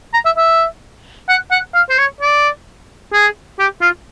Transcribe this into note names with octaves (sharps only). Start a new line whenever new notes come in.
A#5
E5
E5
F#5
F#5
F5
C5
C#5
D5
G#4
G4
F4